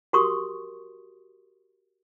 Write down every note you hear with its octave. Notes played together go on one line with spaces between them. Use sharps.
F#4 G4 A#4 C6 C#6 D#6